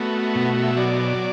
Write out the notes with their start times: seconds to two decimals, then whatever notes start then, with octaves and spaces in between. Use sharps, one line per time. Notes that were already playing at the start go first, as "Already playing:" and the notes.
Already playing: A3 B3 F#4
0.35 B2
0.62 E5
0.76 F#3 D5